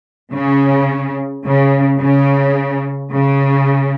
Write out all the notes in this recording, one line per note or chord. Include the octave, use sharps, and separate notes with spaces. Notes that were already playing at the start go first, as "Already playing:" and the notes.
C#3
C#3
C#3
C#3